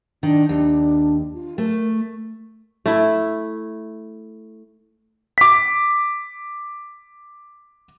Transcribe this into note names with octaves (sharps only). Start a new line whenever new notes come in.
D#3 D4
D#2 D4
F4
A3 A#4
A3 E4
D6 B6